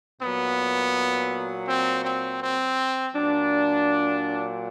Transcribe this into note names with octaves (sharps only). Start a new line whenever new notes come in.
A#2 F#3 B3
C4
C4
C4
A#2 F#3 D4